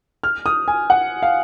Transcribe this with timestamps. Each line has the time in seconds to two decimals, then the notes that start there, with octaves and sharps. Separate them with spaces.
0.23 F6
0.46 D#6
0.68 G#5
0.90 F#5
1.22 F5